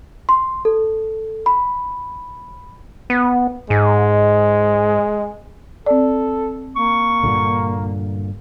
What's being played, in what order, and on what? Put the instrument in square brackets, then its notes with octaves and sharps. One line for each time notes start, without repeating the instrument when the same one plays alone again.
[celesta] C6
A4
B5
[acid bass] B3
[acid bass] G#2 [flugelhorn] G#3
[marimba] C4 D5 [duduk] A4
[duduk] A#3 [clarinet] C#6
[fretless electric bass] G2 A#2 D3